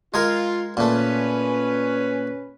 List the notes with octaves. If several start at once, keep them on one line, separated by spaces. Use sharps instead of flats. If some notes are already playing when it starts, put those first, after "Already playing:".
G#3 F4 G#4 A#4
A#2 A3 C#4 B4